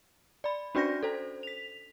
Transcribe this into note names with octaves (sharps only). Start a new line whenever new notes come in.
D5 B5
C#4 D4 F#4 D5 G6 A#6
A4 C5
B6 F7